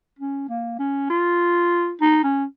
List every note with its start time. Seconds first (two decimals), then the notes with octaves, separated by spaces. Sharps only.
0.19 C#4
0.49 A#3
0.79 C#4
1.10 F4
2.01 D#4
2.24 C#4